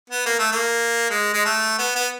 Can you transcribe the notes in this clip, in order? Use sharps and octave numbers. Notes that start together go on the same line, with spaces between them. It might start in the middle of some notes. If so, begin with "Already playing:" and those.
B3
A#3
A3
A#3
G#3
G#3
A3
B3
B3